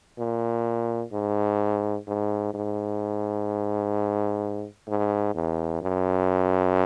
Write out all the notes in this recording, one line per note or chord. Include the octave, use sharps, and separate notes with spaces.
A#2
G#2
G#2
G#2
G#2
E2
F#2